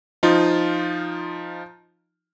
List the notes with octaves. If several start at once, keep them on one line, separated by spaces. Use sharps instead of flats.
F3 D#4 F4